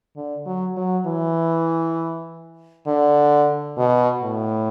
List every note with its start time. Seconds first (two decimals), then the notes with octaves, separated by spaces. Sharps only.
0.16 D3
0.46 F#3
0.77 F#3
1.06 E3
2.87 D3
3.78 B2
4.23 A2